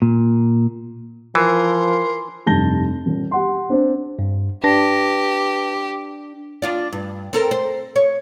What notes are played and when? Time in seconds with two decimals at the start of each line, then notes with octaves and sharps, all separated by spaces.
0.02 A#2
1.35 E3 F3 A#4 C6
2.46 F1 G2 A5 G6 A#6 G7
3.06 D#1
3.31 G4 F#5 C6
3.69 C4 D4 C5
4.19 G2
4.64 D4 G4 B4 A5 A#6
6.62 D4 F4 D5
6.93 G2
7.33 C4 A4 A#4
7.51 C5
7.96 C#5